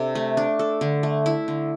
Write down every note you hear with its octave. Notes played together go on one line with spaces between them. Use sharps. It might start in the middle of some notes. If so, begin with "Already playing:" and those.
Already playing: C3 D4 A4
A3
D4
A4
D3
A3
E4
D3